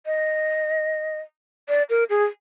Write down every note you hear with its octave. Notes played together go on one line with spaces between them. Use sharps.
D#5
D5
A#4
G#4